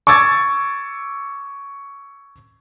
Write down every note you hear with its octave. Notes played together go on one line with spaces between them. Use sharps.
C#6 D6 E6 G#6 A6